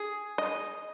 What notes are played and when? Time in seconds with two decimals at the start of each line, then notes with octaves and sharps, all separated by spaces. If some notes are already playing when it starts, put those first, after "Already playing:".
Already playing: G#4
0.38 D#5